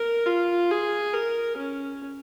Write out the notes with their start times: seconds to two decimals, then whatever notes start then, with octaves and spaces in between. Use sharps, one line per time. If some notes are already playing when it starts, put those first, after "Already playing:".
Already playing: A#4
0.26 F4
0.71 G#4
1.14 A#4
1.57 C#4